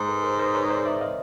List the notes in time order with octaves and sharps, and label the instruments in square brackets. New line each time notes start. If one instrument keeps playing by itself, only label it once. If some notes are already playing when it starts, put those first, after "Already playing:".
Already playing: [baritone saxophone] G#2
[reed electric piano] A4 B4
A#4 C5
A#4 C5
B4 C#5
C5 D5
D5 E5
D#5 F5